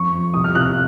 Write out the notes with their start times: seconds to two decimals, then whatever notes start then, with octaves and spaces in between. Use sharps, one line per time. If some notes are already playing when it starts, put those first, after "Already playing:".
Already playing: F2 C#6
0.12 F2
0.33 C2 D#6
0.44 F6
0.55 C2 F#6